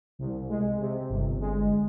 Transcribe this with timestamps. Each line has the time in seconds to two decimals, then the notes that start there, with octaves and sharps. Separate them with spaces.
0.19 C2
0.49 G#3
0.80 C3
1.10 G1
1.40 G#3